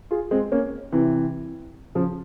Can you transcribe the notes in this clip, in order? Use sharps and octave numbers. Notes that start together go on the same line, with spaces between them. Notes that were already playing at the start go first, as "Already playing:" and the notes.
F4 G#4
G#3 C4
A#3 C#4
C3 E3
C#3 F3